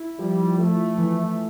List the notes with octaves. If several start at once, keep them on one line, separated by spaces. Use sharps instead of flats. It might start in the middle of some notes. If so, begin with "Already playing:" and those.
Already playing: E4
F3 G3
F3 A3
E3